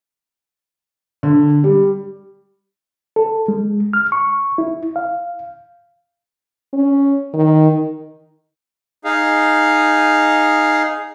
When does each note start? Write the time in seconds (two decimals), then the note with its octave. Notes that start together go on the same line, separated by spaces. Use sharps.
1.23 D3
1.64 G3
3.16 A4
3.48 G#3
3.93 F6
4.12 C#6
4.58 E4
4.96 F5
6.73 C#4
7.34 D#3
9.05 D#4 G#4 F5